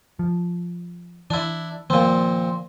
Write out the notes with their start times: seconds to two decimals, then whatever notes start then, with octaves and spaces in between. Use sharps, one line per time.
0.19 F3
1.30 E3 D4 E4
1.90 A#2 D#3 F3 A#3 C4